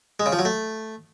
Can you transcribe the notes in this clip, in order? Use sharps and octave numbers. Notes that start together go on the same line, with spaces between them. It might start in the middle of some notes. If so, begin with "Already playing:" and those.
G#3
C#3
F3
F#3
A3